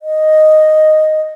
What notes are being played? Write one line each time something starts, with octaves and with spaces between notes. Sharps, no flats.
D#5